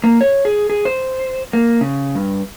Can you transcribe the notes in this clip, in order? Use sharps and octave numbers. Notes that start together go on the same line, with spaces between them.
A#3
C#5
G#4
G#4
C5
A#3
C#3
G2